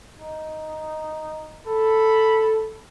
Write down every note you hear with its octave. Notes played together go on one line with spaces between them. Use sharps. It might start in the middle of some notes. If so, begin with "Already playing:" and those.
D#4
A4 B5